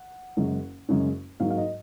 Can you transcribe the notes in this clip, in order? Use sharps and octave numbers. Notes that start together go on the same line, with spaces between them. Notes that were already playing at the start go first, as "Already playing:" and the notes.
Already playing: F#5
F#1 F#2 C#3 G#3 C#4
F#1 F#2 C#3 G#3 C#4
G#2 F#3 A#3 D#4 F5
F5
D#5